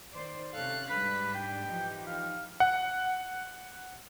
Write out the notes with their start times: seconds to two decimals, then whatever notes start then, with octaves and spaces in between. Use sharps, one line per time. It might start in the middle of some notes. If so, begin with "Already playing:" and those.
0.13 D#3 C5 D5
0.53 C3 C#4 A4 F5 F#6
0.90 G#2 G3 D4 B4 B6
1.35 G4 G5
1.66 E3 F3 D#4
2.07 F5
2.60 F#5